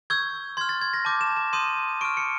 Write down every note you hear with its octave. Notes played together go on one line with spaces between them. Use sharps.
C#6 E6 G6 G#6
C6 F6 G#6
A6
G#6
A#6
A5 D6 G6
E7
E7
C6 D#6 G6 D#7
C#6 F6 D7
C#7